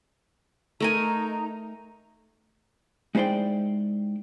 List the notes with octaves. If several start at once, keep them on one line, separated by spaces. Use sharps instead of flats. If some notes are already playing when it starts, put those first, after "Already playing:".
A3 D#4 A#4 G#5 A#5
G#3 D#4 E4 C5 D5 G5